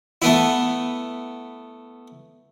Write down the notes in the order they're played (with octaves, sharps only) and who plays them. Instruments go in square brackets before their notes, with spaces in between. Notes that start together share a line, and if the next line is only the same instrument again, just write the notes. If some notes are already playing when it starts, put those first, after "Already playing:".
[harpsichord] A3 B3 E4